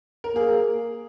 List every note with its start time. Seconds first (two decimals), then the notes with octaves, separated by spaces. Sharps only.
0.24 A#4
0.35 A#3 G#4